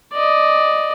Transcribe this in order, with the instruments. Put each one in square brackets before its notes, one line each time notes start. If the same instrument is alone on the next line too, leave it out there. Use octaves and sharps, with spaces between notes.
[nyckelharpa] D5 D#5